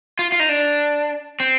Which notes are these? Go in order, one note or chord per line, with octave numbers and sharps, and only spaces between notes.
F4
F4
D#4
D4
C4